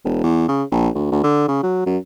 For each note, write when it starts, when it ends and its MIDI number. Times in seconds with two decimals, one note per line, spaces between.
0.05 0.21 28
0.23 0.47 40
0.48 0.63 49
0.71 0.89 34
0.95 1.08 38
1.12 1.20 38
1.23 1.47 50
1.48 1.59 49
1.63 1.83 54
1.86 1.97 42